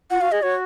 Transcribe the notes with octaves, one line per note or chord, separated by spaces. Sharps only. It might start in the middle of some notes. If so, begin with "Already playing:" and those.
F4 F#5
F#4 F5
G#4 D#5
F#4 C#5